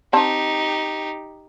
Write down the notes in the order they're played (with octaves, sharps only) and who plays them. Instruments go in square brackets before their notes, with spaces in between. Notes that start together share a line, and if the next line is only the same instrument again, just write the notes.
[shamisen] C4 A5 [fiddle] D#4 G4